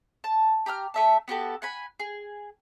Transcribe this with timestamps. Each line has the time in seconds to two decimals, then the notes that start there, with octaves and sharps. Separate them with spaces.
0.24 A5
0.66 G4 A#5 D#6 F6
0.94 A3 E5 A5
1.28 B3 F#4 G4 A4
1.62 F#5 G#5 B5
1.99 G#4